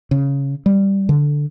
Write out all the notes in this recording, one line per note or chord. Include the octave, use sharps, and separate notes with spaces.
C#3
G3
D3